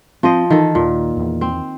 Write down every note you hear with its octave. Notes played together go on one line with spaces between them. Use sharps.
F3 C4 C5 D#5
D#3 E3 A4
D#2 A#2
E2
C4